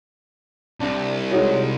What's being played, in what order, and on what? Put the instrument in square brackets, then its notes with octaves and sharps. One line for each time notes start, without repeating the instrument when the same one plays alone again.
[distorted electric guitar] C2 [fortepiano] D4
[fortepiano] G#3 D#4 F#4 [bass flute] C#5